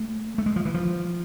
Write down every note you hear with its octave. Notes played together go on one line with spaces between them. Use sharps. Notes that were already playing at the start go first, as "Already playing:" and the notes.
Already playing: A3
A3
G#3
F3
E3
F3